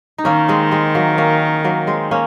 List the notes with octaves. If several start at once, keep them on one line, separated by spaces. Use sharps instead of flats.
D#4
D#3 A#3 C#4
G#3 C4
G#3 C4
F#3 A#3
A#3 C#4
F#3 A#3
G#3 C4
A#3 C#4